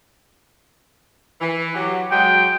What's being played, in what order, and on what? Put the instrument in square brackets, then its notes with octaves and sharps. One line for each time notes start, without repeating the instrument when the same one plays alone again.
[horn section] E3
F#3 G4
[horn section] F#3 G#3 [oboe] G5